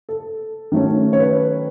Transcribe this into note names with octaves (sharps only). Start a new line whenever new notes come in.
A4
D#3 F#3 A3 C#4
C#5
B4